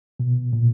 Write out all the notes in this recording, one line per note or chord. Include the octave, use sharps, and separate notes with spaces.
B2
A#2